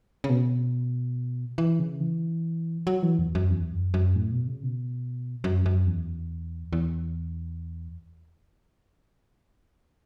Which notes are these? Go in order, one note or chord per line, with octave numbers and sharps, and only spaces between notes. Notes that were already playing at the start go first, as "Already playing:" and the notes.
C#3
B2
E3
C#3
E3
F#3
E3
E2
F#2
E2
F#2
F#2
A2
B2
C#3
B2
F#2
F#2
E2
E2